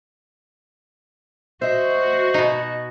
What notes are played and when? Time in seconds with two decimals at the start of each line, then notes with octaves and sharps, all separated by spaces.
1.62 F#4 C5 D#5 E5
2.34 B2 D#4